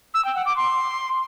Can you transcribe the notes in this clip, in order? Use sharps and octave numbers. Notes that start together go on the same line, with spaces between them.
E6
G5
F#5
D6
C6